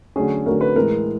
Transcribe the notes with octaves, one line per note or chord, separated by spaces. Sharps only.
D3 F#3 A3 C#4 G#4
D3 F#3 A3 C#4 A#4
B4
A2 E3 G#3 A#4